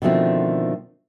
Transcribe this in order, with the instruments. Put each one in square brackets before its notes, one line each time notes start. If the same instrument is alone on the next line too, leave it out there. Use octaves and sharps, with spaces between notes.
[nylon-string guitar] B2 D3 D#3 F3 A3 C4